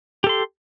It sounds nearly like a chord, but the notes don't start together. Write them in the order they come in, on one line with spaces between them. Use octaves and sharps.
G4 A4 C6